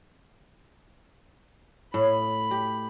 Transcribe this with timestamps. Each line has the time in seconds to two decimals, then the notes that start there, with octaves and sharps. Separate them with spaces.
1.94 A2 B5
2.51 G4